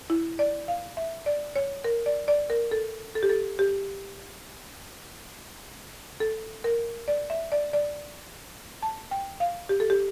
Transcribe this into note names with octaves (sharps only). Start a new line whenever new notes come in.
E4
D5
F5
E5
D5
C#5
A#4
D5
D5
A#4
A4
A4
G4
A4
G4
A4
A#4
D5
E5
D5
D5
A5
G5
F5
G4
A4
G4